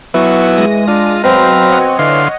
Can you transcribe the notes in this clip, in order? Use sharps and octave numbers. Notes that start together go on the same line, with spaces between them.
E3 F#3 B3 E4 C#6
G#3 A#6 D#7
D4 F4
B2 F#3 C4 B4 C5 F5 A#5
C#5 D#5 F#5
D3 E3 F5 C6